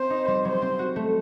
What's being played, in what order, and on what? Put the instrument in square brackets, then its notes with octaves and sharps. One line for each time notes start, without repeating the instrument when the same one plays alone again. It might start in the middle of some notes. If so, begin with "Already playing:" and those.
Already playing: [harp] C4 [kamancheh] C5
[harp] D#4
G3
[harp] F#3 [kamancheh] C5
[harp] C4
F#4
A3